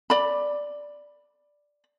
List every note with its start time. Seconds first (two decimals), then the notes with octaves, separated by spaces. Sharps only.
0.10 D5 B5